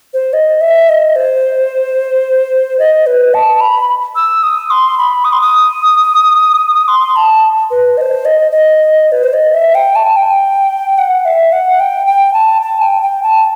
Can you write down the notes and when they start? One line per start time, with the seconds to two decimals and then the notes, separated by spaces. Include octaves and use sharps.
0.14 C5
0.33 D#5
0.61 E5
0.89 D#5
1.16 C5
2.79 D#5
3.06 B4
3.34 A5
3.61 B5
4.15 E6
4.43 D#6
4.70 C6
4.98 B5
5.24 D#6
5.32 C6
5.41 D#6
6.88 C6
7.16 A5
7.71 B4
7.97 D#5
8.01 C5
8.25 D#5
8.51 D#5
9.12 B4
9.23 C5
9.33 D#5
9.54 E5
9.75 G5
9.95 A5
10.16 G5
10.98 F#5
11.25 E5
11.52 F#5
11.80 G5
12.07 G5
12.33 A5
12.62 A5
12.82 G5
13.02 G5
13.23 A5